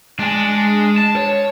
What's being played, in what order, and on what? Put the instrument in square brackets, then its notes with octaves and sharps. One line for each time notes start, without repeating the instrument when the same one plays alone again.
[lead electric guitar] G#3 G#5 [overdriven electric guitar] D4
[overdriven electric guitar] A5
[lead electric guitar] C#5